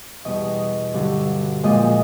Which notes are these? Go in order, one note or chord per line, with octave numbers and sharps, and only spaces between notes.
E2 B2 G3 D#5
G2 D3 F#3
A#2 F3 G#3 D#5